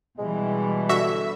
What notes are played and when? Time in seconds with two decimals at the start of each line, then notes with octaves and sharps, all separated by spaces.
0.19 B2 E3 G3 G#3
0.89 D3 F#4 E5